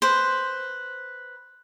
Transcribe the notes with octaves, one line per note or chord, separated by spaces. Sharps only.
B4 C5